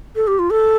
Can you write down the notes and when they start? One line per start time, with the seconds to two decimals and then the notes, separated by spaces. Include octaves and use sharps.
0.16 A4
0.27 G4
0.39 F4
0.50 A4